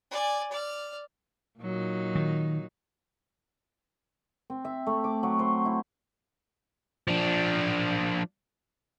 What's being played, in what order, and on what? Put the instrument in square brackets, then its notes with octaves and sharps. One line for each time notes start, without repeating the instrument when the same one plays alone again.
[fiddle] D5 G#5
D5 F6
[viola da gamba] A#2 F#3 D#4
[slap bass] D#3
[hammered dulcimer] C4
E5
A3
D6
F#3
C5
E4
[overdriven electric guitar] F3 D4